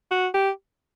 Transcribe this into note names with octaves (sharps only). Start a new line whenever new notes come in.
F#4
G4